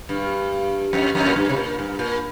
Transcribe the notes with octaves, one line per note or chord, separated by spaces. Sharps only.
G2
F2
F2
A#2
G2
C3
A#2
G2
A#2